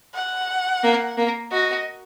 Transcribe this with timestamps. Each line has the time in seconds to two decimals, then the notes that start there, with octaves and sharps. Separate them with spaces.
0.15 F#5
0.83 A#3
1.18 A#3
1.52 F#4 D#5